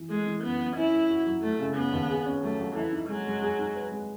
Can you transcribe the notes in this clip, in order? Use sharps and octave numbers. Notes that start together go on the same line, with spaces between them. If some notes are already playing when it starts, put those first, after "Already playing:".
Already playing: E3
G#3 A3
E3
F#2 B3
F#2
C#4 E4
A3
F#4
F#3
F#3 A3
C#3
B3 C#4
D#2
G#4
C#4
F#3 A3
F#3
E3 A4
D#4
F#3 G#3
G#3
G#4
D#4
B4
G#3